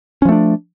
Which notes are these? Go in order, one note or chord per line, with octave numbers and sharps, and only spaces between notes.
F3 A3 C#4 D4